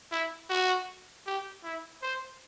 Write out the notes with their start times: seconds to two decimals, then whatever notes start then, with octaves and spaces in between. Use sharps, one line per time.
0.12 E4
0.49 F#4
1.26 G4
1.64 E4
2.02 C5